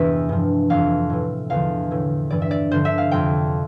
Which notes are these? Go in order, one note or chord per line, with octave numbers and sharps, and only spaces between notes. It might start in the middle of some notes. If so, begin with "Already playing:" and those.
Already playing: E2 G2 C3 E3 E5
G2 F3
F2 E3 F5
A2 E3
E2 D3 F3 F5
A2 E3
G2 E3 D5
E5
D5
G2 D3 F3 C5
E5
F5
F2 C3 F3 G5